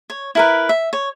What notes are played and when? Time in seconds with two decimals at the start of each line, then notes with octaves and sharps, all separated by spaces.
0.10 C#5
0.35 E4 A#4 B4
0.69 E5
0.93 C#5